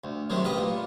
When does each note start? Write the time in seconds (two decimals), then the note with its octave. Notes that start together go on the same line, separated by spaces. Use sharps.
0.04 D2
0.30 C3 D#3 F#3 G#3
0.44 A1 G4 B4 D#5
0.58 A#2